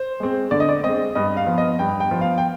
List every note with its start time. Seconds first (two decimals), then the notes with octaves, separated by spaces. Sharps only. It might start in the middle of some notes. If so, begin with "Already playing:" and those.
Already playing: C5
0.20 G#3 C4
0.51 D3 D5
0.60 D#5
0.69 D5
0.83 G#3 C4 D#5
1.15 G2 D#5
1.37 F5
1.47 F3 B3
1.58 D#5
1.79 G2 G5
2.00 G5
2.11 F3 B3
2.21 F5
2.38 G5